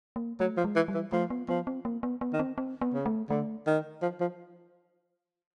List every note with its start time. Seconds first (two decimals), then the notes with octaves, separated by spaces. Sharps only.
0.16 A#3
0.40 F#3 A3
0.58 F3
0.64 G#3
0.76 E3
0.88 G3
0.94 E3
1.12 F3 A3
1.30 B3
1.48 F3 B3
1.67 C4
1.85 A#3
2.03 B3
2.21 B3
2.33 D#3
2.39 C4
2.58 C4
2.81 B3
2.94 C#3
3.06 A3
3.30 D3 A3
3.67 D#3
4.02 F3
4.21 F3